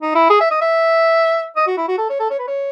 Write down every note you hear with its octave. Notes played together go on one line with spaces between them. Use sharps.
D#4
E4
G#4
E5
D#5
E5
D#5
F#4
E4
F#4
A4
C#5
A4
C#5
B4
C#5